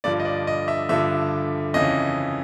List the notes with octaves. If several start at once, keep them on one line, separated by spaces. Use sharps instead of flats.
G2 D3 F3 D5
D#5
D5
D#5
E5
G2 D3 F3 E5
F2 C#3 E3 D#5